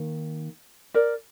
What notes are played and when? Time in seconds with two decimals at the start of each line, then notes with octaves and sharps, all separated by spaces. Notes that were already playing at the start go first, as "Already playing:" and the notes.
Already playing: D#3 A#3
0.94 A#4 D5